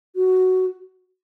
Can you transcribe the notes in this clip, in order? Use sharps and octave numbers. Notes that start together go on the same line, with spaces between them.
F#4